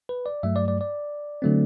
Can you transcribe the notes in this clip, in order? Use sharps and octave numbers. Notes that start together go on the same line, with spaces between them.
B4
D5
G2 F#3 A3 E5
D5
D5
D5
D3 F#3 A3 C4